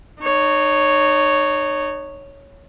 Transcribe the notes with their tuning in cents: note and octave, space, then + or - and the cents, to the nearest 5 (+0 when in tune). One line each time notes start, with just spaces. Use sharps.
D#4 -35 C#5 +0